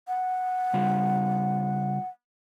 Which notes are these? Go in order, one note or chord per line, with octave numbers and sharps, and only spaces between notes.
F#5
C#3 G3 F4